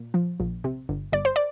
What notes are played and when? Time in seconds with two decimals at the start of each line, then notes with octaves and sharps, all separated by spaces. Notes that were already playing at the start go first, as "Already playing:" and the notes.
Already playing: A#2
0.14 F3
0.40 A#1
0.64 C3
0.89 G1
1.13 G1 D5
1.25 C5
1.36 D5